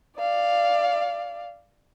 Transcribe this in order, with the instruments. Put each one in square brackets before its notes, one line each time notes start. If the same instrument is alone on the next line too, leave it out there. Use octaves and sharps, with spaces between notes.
[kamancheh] D5 F5